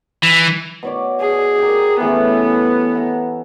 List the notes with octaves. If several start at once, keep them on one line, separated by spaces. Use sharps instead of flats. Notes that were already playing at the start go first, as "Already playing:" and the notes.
E3
B2 C#5 D5
G#4
G4 A#4
E3 A3 B3 C#4
F#5 A#5